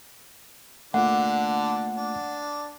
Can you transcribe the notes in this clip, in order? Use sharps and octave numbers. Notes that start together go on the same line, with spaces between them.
D3 A3 A#3 D4 F4 F#5
D4